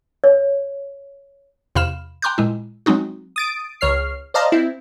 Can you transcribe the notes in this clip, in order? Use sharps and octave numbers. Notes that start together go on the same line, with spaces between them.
C#5
E2 C3 F5 B5 F6 E7
G5 A#5 C6 D6 F#6 G6
A#2 G#3 E4
F#3 G#3 C4 D#4 F#4
D#6 A6 D7
C#2 C#5 F6 C7
C5 D5 D#5 F5 A5 A#5
C4 E4